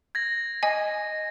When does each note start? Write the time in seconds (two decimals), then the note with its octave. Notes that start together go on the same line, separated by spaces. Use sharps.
0.15 G#6 A#6
0.63 D#5 G#5